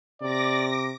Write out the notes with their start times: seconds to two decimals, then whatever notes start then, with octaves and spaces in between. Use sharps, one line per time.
0.22 C3 D5 D6 A#6